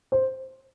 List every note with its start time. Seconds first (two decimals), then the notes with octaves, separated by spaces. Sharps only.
0.12 C5